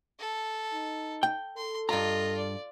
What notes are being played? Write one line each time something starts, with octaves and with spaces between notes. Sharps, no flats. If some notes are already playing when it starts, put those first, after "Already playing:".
A4
D#4
G5
A4 C6
G2 F4 D#5 A#5
D5